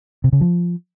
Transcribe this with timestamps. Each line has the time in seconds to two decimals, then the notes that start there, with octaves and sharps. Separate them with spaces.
0.24 C3
0.33 C#3
0.41 F3